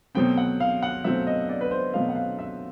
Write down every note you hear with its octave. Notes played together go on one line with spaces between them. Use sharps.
B2 F#3 A3 C4 G5
F#5
F5
F#5
B2 F#3 A3 C4 E5
D#5
D5
B4
C5
B2 F#3 A3 C4 F5
F#5
F5
E5